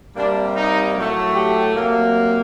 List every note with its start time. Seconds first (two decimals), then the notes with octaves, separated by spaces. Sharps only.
0.16 C3 G3 A#3 D4
0.56 D#4
0.95 A2 F#3 A3
1.35 G4
1.76 C3 F#3 A#3